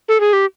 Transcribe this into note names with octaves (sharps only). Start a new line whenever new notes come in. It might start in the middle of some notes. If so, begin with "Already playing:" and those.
A4
G#4
G4